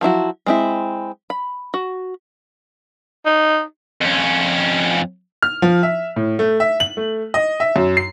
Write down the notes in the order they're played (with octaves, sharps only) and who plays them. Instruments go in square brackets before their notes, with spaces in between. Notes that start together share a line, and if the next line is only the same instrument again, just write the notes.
[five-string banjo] F3 F#3 E4 F#4
G#3 C4 E4
B5
F#4
[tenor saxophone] D#4
[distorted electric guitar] F2 C#4
[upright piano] F6
F3
E5
A2
A3
E5
F#7
A3
D#5
E5
F#2
C7